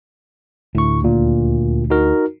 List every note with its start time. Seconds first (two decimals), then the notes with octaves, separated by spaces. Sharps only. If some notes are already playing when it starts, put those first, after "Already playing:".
0.75 D2 A2 C#6
1.02 D#2 A#2
1.90 D#4 F#4 A#4